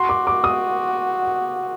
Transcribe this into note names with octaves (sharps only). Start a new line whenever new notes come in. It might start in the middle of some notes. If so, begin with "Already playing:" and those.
Already playing: F#4 C6
D6
D6
D#6